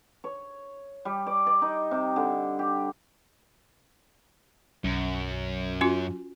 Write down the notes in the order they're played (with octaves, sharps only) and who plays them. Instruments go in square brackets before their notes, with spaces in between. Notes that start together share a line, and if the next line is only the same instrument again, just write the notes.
[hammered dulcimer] C#5
G3
D5
D5
D#4
C3
D3
G4
[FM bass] B1 [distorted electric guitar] F#2
[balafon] C#4 F4 F#4